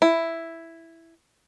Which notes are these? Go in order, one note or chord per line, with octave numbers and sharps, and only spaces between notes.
E4